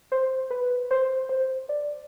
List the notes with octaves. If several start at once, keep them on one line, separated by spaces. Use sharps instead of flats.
C5
B4
C5
C5
D5